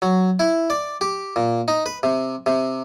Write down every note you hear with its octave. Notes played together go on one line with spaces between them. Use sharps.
F#3
E4
D5
G4
A#2
D#4
B4
C3
C3